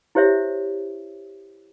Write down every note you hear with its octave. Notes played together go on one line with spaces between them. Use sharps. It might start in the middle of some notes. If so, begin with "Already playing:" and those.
E4 G4 C5 C#5 E5